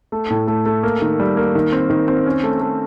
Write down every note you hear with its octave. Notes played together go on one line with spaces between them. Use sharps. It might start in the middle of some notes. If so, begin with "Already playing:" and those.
A3
A2
A3
A3
A#3
D#3
G3
A#3
D#3
C4
D#3
C4
C#4
A3
A3